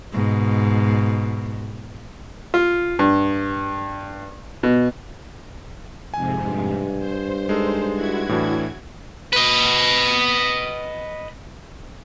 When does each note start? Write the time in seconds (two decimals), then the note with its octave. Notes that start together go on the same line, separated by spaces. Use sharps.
0.13 G#2 B2
2.54 F4
2.99 G2
4.63 B2
6.14 F2 G#2 C3 G#5
6.45 G2
6.98 C5
7.49 G#3 D#4 A4
7.95 E4 F#4 G#6
8.29 A2 E3 D4
9.33 B4 D#5